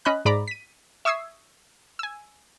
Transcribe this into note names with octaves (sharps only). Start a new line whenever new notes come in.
C#4 D#5 B5 F#6
G#2 D5 A#5 B5 D6
B6 D#7
E5 C#6 D#6 E6 G#6 C7
G#5 E6